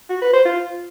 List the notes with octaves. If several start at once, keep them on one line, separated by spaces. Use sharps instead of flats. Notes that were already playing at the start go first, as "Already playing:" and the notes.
F#4
B4
C5
F4